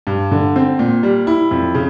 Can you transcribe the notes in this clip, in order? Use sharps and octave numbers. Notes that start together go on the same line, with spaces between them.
G2
D3
C4
A#2
G3
E4
F2
C#3